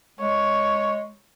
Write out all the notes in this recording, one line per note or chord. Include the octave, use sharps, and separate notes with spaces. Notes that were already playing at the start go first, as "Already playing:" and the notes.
G#3 C#5